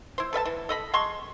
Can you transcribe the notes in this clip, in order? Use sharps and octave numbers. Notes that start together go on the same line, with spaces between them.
E4 C5
A4 B4 E5 A5
E3
A4 D#5 B5
G#3 A5 C6 C#6